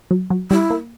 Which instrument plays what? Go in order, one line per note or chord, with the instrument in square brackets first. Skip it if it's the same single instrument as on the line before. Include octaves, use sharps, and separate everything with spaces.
[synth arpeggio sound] F#3
F#3
[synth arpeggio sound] G3 [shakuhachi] E4
[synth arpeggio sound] A#3